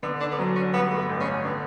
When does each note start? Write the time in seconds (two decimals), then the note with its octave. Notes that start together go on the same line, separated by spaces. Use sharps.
0.03 D3 B3
0.20 D4
0.32 B3
0.38 F#3 C#4
0.56 C#4
0.74 G2 B3
0.91 A3
0.98 B3
1.09 A1
1.20 C#4
1.44 D3 B3